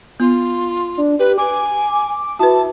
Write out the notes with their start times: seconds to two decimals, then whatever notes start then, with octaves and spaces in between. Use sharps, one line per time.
0.20 B3 F4
0.97 D4
1.19 G4 B4
1.38 G#5 D6
2.39 E4 F#4 B4 A5